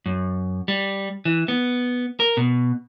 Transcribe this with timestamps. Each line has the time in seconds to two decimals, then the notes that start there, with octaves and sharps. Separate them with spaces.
0.06 F#2
0.68 G3
1.25 E3
1.48 B3
2.20 A#4
2.37 B2